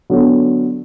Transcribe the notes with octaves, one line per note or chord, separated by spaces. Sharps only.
D3 F#3 B3